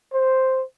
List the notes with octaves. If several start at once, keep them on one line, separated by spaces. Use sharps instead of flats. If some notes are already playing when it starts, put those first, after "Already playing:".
C5